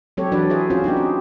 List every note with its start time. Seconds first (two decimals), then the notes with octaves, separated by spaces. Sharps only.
0.17 F#3 G#3 C4 G4 A4 C#5
0.32 E3 F#3 D4 F#4 B4 D5
0.50 F3 G#4 C5 E5
0.70 C4 C#4 F4 F#4 C5
0.84 B3 D4 D#4 G4
0.97 C4